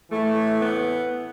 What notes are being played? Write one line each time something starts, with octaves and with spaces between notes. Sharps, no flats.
A2 E3 A3
B3